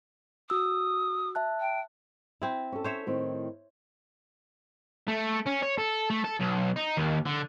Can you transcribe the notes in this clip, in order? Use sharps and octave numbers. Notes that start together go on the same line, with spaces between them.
F#4 D#6 E6
E5 A5 F#6
G5
C4 E4
C#4 A4
C5 C#5 E5
A2 D#3 C4
A3
C#4
C#5
A4
A3
A4
B1
D#4
D#2
D3